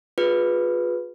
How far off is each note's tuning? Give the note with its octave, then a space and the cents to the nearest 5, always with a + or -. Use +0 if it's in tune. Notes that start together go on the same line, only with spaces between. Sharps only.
F4 +35 G#4 +0 B4 +0